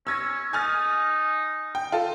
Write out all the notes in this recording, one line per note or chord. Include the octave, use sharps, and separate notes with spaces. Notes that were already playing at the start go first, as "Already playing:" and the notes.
C#4 E6 G#6 A#6
D#4 G#5 F6 A6
G5
F4 A4